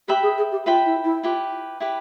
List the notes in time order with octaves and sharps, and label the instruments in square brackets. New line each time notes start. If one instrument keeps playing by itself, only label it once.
[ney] G4 [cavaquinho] B4 E5 G5 B5
[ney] G#4
G#4
G4
[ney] F4 [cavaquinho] B4 E5 G5 B5
[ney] E4
E4
[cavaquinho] E4 G4 B4 [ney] F4
[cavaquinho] E4 G4 B4